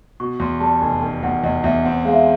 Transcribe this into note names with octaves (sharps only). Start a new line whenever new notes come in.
B2 C#6
E2 C6
G3 A5
F1 G#5
F1 G5
E2 F#5
E2 D#5
E2 E5
C4 F#5
G#3 F5
E5